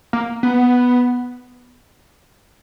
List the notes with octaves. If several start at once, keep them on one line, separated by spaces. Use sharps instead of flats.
A#3
B3